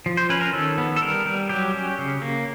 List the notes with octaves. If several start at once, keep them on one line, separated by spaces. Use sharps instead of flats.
F3
C5
C#4 B4
A#4
D#3 A4
B3
A4
G3 A#4
G3
F#3 G4
C#4
C#3
A#3